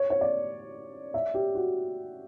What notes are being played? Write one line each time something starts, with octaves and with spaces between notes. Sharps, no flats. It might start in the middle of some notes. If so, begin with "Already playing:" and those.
Already playing: C#5
C#5
D5
E5
G4
F#4